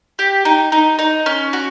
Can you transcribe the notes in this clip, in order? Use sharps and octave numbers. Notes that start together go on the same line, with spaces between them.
G4
D#4
D#4
D#4
C#4
F#4